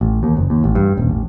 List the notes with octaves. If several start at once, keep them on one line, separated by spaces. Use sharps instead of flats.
A1
D#2
F#1
D#2
A1
G2
D#1
A1